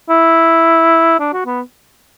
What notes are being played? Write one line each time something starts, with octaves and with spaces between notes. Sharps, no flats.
E4
D4
F#4
B3